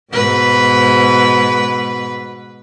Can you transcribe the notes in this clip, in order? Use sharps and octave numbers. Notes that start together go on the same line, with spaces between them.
G#2 B2 B4